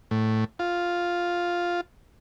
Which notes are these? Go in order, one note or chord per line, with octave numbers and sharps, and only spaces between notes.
A2
F4